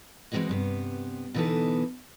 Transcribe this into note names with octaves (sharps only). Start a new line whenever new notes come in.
E3 G#3 A#3 C4 F#4 D#5
G2 C3 B3
B2 D3 E3 B3 D#4 A4